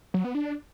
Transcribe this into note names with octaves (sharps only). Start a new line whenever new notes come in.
F#3
B3
D4